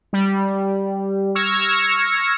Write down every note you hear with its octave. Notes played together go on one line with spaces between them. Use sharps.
G3
C#6 E6 F6 G#6 A#6 C#7